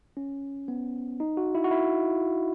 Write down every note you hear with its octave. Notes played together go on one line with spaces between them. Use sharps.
C#4
B3
D#4
F#4
E4
F#4
E4